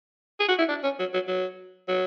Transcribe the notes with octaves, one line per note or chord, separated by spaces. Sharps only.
G#4
F#4
E4
D4
C#4
F#3
F#3
F#3
F#3